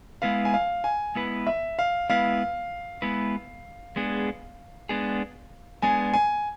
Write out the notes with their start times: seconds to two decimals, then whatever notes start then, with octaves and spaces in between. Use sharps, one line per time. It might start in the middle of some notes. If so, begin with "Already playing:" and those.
0.22 G#3 B3 E4 B4 F5
0.45 G#5
0.54 F5
0.84 G#5
1.15 G#3 B3 E4 B4
1.47 E5
1.79 F5
2.09 G#3 B3 E4 B4 F5
3.02 G#3 B3 E4 B4
3.96 G#3 B3 D4 G#4
4.89 G#3 B3 D4 G#4
5.82 G#3 B3 D4 G#4 G#5
6.14 G#5